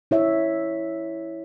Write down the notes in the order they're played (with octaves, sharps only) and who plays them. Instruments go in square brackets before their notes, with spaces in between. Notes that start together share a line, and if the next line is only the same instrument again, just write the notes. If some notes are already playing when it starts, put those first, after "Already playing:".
[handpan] E4 C#5 E5